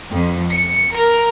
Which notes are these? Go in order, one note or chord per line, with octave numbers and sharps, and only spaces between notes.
F2
C#7
A#4